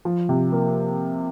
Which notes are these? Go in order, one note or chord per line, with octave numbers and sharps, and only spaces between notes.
F3
C3
A#3